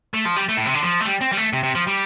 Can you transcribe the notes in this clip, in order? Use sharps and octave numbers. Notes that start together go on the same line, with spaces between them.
A3
F3
G3
A3
A2
C3
D3
F3
A3
G3
C4
G3
A3
C3
C3
F3
G3